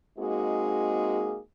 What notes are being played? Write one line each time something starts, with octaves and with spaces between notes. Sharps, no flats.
G#3 A#3 C4 D#4 F#4 G#4